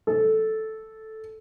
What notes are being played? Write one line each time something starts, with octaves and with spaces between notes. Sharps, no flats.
A4